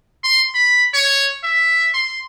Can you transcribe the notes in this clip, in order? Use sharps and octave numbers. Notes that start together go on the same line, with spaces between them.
C6
B5
C#5
E5
C6